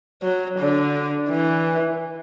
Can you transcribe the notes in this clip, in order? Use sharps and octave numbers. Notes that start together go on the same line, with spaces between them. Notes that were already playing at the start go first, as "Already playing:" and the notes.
F#3
D3
E3